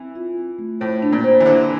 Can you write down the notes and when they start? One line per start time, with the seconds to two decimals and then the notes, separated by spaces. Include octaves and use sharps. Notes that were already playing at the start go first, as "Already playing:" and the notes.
Already playing: E3 C4
0.16 F4
0.37 C4
0.59 A3
0.80 A2 C5
1.02 D4
1.12 A#2
1.24 C5
1.40 E3
1.46 D3 C5